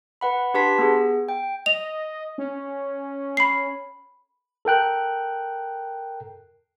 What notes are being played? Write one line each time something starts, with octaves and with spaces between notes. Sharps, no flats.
B4 F#5 B5
D4 G4 B4 A5 C6 B6
B3 G#4
G5
D#5 F7
C#4
B5 C7
A4 A#4 G5 F#6